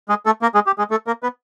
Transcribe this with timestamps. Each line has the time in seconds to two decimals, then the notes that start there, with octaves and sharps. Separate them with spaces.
0.09 G#3 G#4
0.26 A3 A4
0.42 A#3 A#4
0.55 G#3 G#4
0.67 G4
0.78 G#3 G#4
0.91 A3 A4
1.07 A#3 A#4
1.23 B3 B4